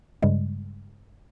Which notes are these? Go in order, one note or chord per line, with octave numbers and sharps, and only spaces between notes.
G2 C#3 G3 G#3